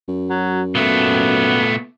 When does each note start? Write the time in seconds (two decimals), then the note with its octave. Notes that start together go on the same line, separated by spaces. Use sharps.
0.08 F#2
0.30 F#3
0.75 A#2 A3 B3